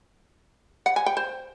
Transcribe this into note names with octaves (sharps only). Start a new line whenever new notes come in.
F#5
G#5
G5
C5